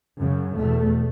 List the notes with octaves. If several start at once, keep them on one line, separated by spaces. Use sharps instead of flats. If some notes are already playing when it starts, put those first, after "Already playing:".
F#2 C#3
E2 B2 A3